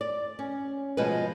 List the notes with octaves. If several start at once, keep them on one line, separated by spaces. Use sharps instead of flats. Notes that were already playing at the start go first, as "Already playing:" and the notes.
D5
C#4
B2 F3 G#3 B3 G#4 B4